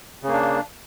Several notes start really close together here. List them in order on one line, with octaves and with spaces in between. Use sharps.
C#3 A#3 D4